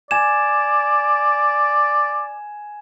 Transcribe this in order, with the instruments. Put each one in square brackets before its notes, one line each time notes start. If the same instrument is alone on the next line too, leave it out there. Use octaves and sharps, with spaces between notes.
[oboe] D5 [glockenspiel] G#5 G#6 E7